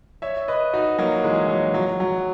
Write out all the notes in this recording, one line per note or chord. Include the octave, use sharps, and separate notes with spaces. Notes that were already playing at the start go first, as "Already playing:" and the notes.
C#5 E5
B4 D#5
D#4 F#4
F#3 A#3
E3 G#3
F#3
F#3
F#3